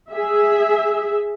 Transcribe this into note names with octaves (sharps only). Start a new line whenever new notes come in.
G#4 E5